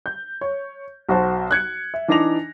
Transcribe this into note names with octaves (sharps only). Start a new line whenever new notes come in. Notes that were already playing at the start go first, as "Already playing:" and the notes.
G6
C#5
B1 F#4 C5 A5
F#6 G#6 C#7
E5
E3 D4 D#4 D6 A#6 F7